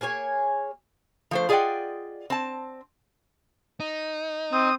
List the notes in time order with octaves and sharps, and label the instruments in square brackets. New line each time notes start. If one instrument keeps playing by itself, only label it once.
[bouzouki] A#3 G#4 C#5 G#5
[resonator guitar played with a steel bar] F3 A3 C5
F4 G#4 D5 D#5 F#5 G5
C4 A5
[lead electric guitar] D#4
[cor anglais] C4 [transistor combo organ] D#6